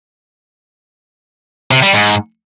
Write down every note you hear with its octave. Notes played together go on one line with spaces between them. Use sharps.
C3
G3
G#2